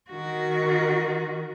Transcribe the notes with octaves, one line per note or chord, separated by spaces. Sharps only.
D#3 F#4